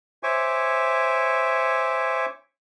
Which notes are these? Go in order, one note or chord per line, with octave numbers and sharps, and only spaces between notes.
C5 C#5 E5 G#5 C#6 D6